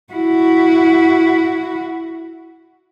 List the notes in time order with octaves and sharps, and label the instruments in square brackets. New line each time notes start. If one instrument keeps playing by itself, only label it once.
[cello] E4 F#4